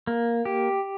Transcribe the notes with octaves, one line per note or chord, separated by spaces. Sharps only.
A#3
G4